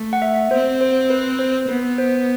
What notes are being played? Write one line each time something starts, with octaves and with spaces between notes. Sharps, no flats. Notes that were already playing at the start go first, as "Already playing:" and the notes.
Already playing: A3
F#5
E5
C4 C5
C5
B4
C5
B3 B4
C5